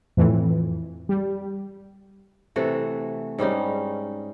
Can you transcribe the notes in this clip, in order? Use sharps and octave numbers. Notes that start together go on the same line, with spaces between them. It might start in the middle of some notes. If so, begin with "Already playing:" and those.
F2 A2 E3
G3
C3 E3 A3 F#4
G#2 G3 C#4 D#4